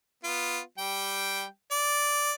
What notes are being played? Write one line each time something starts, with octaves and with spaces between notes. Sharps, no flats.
B3 F4
G3 G5
D5